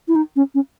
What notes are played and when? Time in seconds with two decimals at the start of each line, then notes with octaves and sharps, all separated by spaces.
0.08 E4
0.15 D#4
0.36 C#4
0.55 C#4